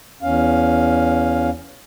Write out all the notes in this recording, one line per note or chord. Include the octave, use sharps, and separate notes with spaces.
E2 C#4 F5